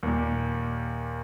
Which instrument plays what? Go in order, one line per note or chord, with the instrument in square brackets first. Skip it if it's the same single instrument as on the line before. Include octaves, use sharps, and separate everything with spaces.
[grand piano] D#2 A#2